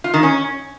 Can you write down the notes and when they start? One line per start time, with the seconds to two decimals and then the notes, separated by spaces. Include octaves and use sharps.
0.04 F4
0.14 D#3
0.23 C#4